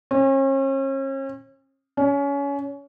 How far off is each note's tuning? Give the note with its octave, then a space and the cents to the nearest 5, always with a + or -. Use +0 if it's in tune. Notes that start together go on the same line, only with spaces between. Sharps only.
C#4 -40
C#4 +25